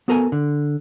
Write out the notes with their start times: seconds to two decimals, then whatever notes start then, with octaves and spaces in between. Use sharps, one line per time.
0.08 B3 F#4 A4 A#4 G#5 A5
0.32 D3